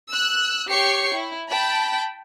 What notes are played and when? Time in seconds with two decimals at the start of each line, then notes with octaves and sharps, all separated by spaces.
0.10 E6 F#6
0.70 G4 C#5 G5 C#6 C7 C#7
1.15 E4
1.48 G5 A5 B5